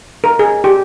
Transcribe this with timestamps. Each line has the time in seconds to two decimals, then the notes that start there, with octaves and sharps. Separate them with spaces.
0.24 A#4
0.39 G#4
0.64 G4